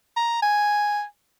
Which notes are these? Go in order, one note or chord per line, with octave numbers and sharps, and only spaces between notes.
A#5
G#5